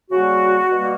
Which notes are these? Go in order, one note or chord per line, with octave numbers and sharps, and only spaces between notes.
C#3 G3 A#3 F#4
B2 G3 A#3